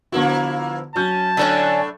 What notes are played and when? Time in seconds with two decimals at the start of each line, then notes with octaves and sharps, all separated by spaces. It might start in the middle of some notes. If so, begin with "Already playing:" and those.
0.12 D3 F3 A#3 B3 E4 F#4
0.96 F#3 C#4 A5 G6
1.37 A2 D3 A3 B3 C#4 D4